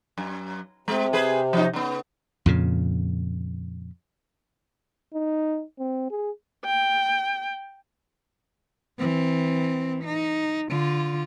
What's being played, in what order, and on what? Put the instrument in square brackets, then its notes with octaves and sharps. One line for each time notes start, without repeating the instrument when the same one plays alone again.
[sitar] F#2
[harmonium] C3 [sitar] G#3
[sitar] G#4 B4 C5
F3 C#4 D#4
C#3 B3
[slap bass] F2 A#2 C#3
[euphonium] D#4
C4
G#4
[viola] G5
[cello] E3 C4
D#4
D3 F4